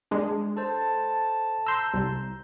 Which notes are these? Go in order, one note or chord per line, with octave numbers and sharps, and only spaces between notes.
G#3 D4
A4 C5 A5
A#5 C6 E6 G6
C2